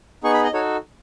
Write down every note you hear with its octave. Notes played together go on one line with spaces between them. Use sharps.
B3 D#4 G#4 C#6
B5
D#5
D#4 F#4 A4 C#5